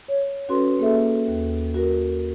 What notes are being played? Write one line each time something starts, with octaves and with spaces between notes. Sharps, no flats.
C#5
C#4 F#4 A4 B4 C6
A#3 G#4 A4 E5
D#2
F#4 A#4